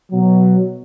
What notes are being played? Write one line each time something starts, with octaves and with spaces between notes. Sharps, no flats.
B2 F#3